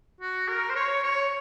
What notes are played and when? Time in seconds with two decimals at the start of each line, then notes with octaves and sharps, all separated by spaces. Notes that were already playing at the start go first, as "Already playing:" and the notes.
0.21 F#4
0.48 A#4
0.70 C5
0.75 C#5
1.03 C#5